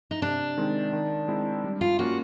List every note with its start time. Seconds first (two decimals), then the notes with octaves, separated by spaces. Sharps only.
0.11 D#4
0.22 C3 D4
0.57 D#3 G#3 C4
0.93 D#3
1.28 G#3 C4 E4
1.64 G3
1.81 F4
1.99 A#3 C#4 F4 F#4